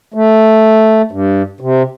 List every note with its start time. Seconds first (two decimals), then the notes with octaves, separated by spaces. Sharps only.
0.14 A3
1.12 G2
1.60 C3